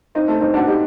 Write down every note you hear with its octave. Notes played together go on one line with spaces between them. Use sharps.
C4 D#4
A3 C4
C4 D#4
D4 F#4
D#4 G4